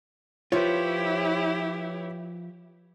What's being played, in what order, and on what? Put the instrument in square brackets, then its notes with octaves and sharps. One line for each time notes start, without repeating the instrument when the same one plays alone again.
[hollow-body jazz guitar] F3 F4 [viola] E4 G4 [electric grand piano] B4 C#5